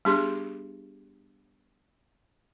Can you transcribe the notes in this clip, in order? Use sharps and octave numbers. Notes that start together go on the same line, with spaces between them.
G3 B3 D4 G4 G#4 C6